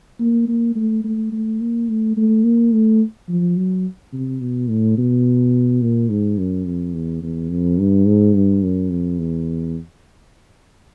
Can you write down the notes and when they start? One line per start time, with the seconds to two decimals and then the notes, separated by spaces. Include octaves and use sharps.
0.20 A#3
0.48 A#3
0.76 A3
1.04 A3
1.32 A3
1.60 A#3
1.89 A3
2.17 A3
2.44 A#3
2.72 A3
3.29 F3
3.57 F#3
4.13 C3
4.41 B2
4.69 A2
4.98 B2
5.82 A#2
6.09 G#2
6.38 F#2
6.66 F2
6.94 E2
7.22 E2
7.50 F2
7.78 G2
8.06 G#2
8.34 G2
8.62 F#2
8.90 F2
9.19 E2